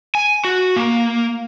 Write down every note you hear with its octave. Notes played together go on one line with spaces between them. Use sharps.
G#5
F#4
A#3